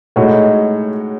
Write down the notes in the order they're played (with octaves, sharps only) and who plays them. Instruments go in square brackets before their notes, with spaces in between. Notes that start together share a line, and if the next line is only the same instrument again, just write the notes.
[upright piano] A2 G#3 D#4 F#4 C#5